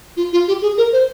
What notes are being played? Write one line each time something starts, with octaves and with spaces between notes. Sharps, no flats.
F4
F4
G4
G#4
A#4
C5